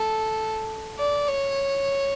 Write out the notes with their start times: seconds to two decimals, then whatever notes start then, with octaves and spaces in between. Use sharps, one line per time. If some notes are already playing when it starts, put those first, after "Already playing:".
Already playing: A4
0.99 D5
1.28 C#5